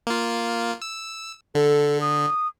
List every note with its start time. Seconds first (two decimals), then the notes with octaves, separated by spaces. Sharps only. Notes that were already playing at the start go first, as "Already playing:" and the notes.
0.07 A#3 F4
0.82 E6
1.55 D3 A4
2.01 D#6